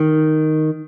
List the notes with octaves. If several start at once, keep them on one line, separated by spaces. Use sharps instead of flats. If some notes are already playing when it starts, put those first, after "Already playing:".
Already playing: D#3